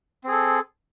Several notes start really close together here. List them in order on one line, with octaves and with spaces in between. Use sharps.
C4 G#4 A4